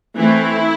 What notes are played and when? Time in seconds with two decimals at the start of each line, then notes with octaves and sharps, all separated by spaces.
0.16 E3 A3 C4 E4